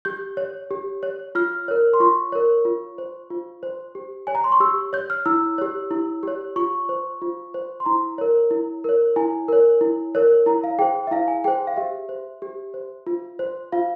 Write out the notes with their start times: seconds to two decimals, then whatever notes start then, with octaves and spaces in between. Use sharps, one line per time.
0.05 G4 G6
0.37 C#5
0.71 G4
1.03 C#5
1.35 F4 F6
1.68 A#4 C#5
1.93 C6
2.00 F4 C#6
2.32 A#4 C#5
2.65 F4
2.98 C5
3.30 F4
3.63 C5
3.95 G4
4.27 C#5 G#5
4.35 A#5
4.44 C6
4.52 C#6
4.60 G4 E6
4.93 C#5 G6
5.10 F6
5.26 E4 E6
5.58 G4 C#5
5.91 E4
6.23 G4 C#5
6.56 F4 C#6
6.89 C5
7.22 F4
7.54 C5
7.80 C6
7.86 E4 A#5
8.18 A#4 C#5
8.51 E4
8.84 A#4 C#5
9.16 E4 G#5
9.48 A#4 C#5
9.81 E4
10.15 A#4 C#5
10.46 E4 A#5
10.64 F5
10.79 G#4 C5 G5
11.07 E5
11.11 E4 F5
11.28 G#5
11.44 G#4 C5 G5
11.67 F5
11.76 G4 E5
12.09 C5
12.42 G4
12.74 C5
13.07 F4
13.39 C5
13.72 F4 F5